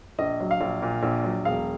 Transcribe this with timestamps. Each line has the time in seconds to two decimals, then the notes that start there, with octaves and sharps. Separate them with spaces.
0.19 A#1 D#5
0.40 F#3
0.51 F5
0.61 A#1
0.82 A#2
1.03 A#1
1.24 F#3
1.45 E1 F5